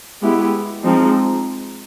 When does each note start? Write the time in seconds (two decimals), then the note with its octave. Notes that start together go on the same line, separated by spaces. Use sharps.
0.22 G#3 B3 E4 G4
0.83 F3 G#3 C4 D#4